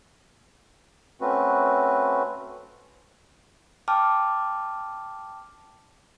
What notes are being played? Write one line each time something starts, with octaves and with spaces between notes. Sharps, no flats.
A3 C4 C#4 F#4 B4
G5 A5 D6 F6